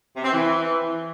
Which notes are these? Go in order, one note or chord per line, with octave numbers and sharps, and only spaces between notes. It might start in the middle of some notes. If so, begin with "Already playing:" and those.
C3
C4
E3